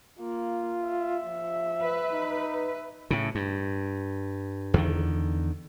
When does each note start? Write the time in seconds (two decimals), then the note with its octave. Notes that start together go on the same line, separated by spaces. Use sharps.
0.19 A#3 F4
0.86 E5
1.26 F3
1.82 B4
2.12 D#4
3.11 A2 C#3
3.35 G2
4.74 E2 D3 D#3